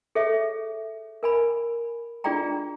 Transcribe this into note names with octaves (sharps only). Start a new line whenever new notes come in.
G#4 A4 C#5 E5
A#4 G#5 B5
D4 F4 G#4 D5 G5 A#5